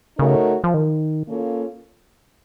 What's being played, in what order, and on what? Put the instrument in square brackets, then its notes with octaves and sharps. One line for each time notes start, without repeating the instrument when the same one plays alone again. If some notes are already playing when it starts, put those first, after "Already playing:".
[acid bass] C#3 [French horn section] A3 D#4 F#4 A#4 C#5
[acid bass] F3
D#3
[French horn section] A#3 C#4 F4 A4 C#5